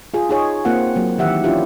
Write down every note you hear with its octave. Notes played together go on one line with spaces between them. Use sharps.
F4 G#4
D#4 G#4 C#5
A#3 C4 F4 F#5
F#3 A#3
D#3 E3 G4 E5 F#5
C#4 D4 E4 F4 G4